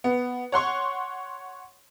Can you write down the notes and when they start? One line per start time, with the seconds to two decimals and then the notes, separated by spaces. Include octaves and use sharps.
0.04 B3
0.52 C#5 F#5 C6 C#6